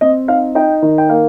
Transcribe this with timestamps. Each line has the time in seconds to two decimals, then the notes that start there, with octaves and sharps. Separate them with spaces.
0.01 C4 D#5
0.28 D#4 F5
0.55 D#4 G5
0.82 D#3
0.98 G5
1.09 A#3 F5